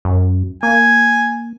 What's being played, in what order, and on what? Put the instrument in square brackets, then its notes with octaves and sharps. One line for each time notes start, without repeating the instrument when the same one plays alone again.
[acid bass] F#2
[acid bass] A#3 [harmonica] G#5